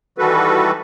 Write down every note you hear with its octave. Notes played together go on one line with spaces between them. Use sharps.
D#3 E3 G3 F#4 A4 B4